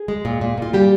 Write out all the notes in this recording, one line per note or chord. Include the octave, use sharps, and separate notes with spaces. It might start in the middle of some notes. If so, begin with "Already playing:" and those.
Already playing: G#4
G#3
A#2
A#2
A#2 F4
G3 G4